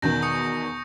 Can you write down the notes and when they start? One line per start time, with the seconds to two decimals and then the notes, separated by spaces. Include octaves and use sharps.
0.02 E2 B2 D#3 G6 A#6
0.22 C#6 D#6 C#7